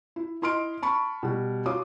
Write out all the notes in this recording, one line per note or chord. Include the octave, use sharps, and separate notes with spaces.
E4
E4 D#5 C6 F6 D7
A5 B5 C#6
B2 G3
F4 F#4 C#5 D6 D#6